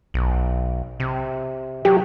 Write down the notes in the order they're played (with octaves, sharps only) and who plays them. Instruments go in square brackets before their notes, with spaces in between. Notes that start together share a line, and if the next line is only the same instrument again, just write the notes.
[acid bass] B1
C3
[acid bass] F#3 [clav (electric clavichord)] G4